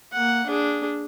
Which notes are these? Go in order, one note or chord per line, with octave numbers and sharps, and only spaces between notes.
A#3 F#5
D4 G#4